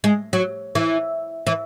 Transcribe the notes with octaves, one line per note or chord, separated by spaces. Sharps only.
G#3
F#3
E3
E3